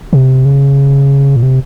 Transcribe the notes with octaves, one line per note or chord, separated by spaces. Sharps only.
C3
C#3
A#2
C3